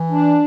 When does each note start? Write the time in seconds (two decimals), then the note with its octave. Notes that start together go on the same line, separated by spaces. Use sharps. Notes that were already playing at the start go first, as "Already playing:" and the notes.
Already playing: E3
0.11 D4